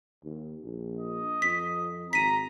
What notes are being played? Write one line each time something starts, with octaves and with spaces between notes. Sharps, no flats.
D#2
A#1
D#5
F2 B6
G#1 A#5 B6 D#7